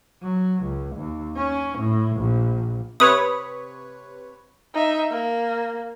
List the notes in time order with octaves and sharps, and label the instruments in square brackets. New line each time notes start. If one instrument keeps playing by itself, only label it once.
[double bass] F#3
C#2
D#2
C#4
A2
A#1
[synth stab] C3 B4 C#5 [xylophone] D#6
[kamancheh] D#4 E5
A#3